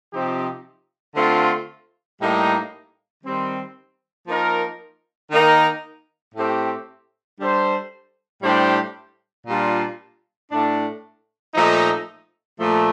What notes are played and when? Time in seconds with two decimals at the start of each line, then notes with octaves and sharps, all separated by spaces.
0.12 C3 F3 C4 D#4 G4
1.15 D3 A3 C4 F4
2.20 A2 G3 A#3 D#4
3.24 D#3 G3 C4
4.27 F3 A#3 D#4 A#4
5.31 D#3 A#3 D#4 A#4
6.35 A2 A3 C4 G4
7.39 G3 D4 A4 C5
8.43 A2 G3 D4 G4 C5
9.46 A#2 G3 D4 F4
10.50 A2 A3 D4
11.54 A#2 F3 A3 D#4
12.59 A#2 F3 A3